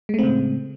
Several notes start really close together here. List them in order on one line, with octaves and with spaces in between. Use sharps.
G#3 A3 C4 C#3 A2